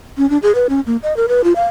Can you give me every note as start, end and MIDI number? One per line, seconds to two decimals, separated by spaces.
0.18 0.29 61
0.30 0.38 62
0.43 0.55 68
0.55 0.67 71
0.69 0.80 61
0.86 0.97 58
1.03 1.15 75
1.17 1.26 70
1.28 1.44 71
1.44 1.53 65
1.56 1.65 77